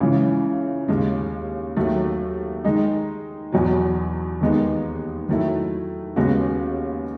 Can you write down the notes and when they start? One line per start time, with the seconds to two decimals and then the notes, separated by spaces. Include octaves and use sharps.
0.01 C#2 C#3 E3
0.88 D#2 C#3 G#3
1.77 D#2 D#3 F#3 A3
2.64 D#3 G#3 D#4
3.52 E2 B2 F#3
4.41 D#2 D#3 G#3 B3 D#4
5.29 D#3 F#3 A3 E4
6.16 D#2 C#3 G#3 B3 F#4